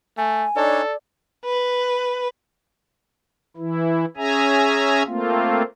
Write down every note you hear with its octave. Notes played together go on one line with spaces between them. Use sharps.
A3 G#5
D4 D#4 A4 C#5 D5
B4
E3 E4
C#4 G#4 E5 G#5 A#5
A3 A#3 C4 F4